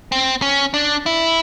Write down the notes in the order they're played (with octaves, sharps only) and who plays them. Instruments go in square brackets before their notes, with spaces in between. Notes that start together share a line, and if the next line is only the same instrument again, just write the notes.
[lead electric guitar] C4
C#4
D4
E4